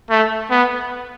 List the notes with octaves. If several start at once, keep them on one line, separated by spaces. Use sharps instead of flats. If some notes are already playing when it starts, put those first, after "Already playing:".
A3
B3